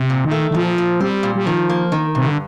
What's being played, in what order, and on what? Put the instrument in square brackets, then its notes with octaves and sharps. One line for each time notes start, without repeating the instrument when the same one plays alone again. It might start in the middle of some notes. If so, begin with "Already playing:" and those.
Already playing: [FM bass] C3
[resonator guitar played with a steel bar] A#2
[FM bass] D#3
[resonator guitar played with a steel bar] A3
[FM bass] D#3
[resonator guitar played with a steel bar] A#2 [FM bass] F3
[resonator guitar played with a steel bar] A#2
[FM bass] G3 [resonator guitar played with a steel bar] C4
[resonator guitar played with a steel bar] A#2
[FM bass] G3
[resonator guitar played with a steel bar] D#3 [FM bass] F3
[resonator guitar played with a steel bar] A#3
D#3
[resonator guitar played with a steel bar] G2 [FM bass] C3
[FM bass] D3